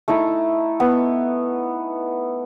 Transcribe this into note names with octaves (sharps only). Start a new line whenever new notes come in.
A3 D#4 E4 A4
B3